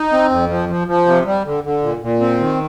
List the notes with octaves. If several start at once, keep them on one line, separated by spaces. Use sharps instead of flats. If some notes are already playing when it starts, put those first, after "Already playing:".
Already playing: D#4
C4
F2
F3
F3
F3
C3
G3
D3
D3
A#2
A#2
C4
D#3